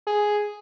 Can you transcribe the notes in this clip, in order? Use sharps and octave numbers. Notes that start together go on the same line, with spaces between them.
G#4